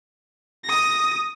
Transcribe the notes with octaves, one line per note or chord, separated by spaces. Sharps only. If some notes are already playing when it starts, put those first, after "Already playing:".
D#6 A#6